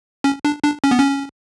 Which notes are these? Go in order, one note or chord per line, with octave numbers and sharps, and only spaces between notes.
C#4
D4
D4
C#4
B3
C#4